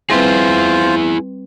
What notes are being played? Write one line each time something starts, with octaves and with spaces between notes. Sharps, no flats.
G3 C4 E4 F4 G#4 B4 C5